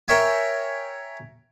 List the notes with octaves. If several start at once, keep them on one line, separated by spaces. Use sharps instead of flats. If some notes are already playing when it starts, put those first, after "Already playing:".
A#4 C#5 E5 G5 G#5